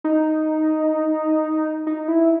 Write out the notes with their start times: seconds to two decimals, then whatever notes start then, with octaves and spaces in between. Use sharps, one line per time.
0.04 D#4
1.87 D#4
2.08 E4